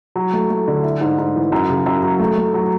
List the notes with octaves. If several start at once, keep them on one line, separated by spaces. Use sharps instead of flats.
F#3
A3
A3
D3
E4
G#2
G#2
E3
F#2
C#3
F#2
F#3
A3
A3
F#3